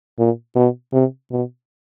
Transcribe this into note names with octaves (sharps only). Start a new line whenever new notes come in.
A#2
B2
C3
B2